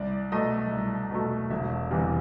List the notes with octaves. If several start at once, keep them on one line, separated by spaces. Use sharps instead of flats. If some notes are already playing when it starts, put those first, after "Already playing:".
Already playing: C2 D5
B2 F#3 A3 D#5
C2
B2 F#3 A3
E1 E5
E2 C3 E3 G3